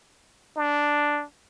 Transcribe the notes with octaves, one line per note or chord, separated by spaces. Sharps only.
D4